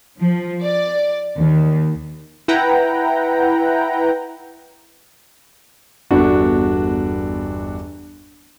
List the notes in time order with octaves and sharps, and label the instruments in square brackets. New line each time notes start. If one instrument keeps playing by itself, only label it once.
[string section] F3
D5
D#2
[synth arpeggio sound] E4 B4 F#5 G5 A#5
[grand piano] G1 E2 D4 F#4